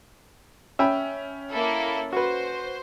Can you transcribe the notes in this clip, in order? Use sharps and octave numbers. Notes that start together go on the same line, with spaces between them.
C#4 E5 G5 B5
A#3 E4 A4
F#4 B4 C5